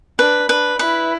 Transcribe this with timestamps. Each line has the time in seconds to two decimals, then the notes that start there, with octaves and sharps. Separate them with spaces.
0.19 D4 B4
0.49 D4 B4
0.79 E4 B4